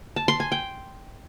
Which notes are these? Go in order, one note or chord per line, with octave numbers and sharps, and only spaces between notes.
A5
C6
G#5
G5